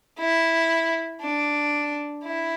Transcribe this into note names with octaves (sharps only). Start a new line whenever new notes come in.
E4
D4
E4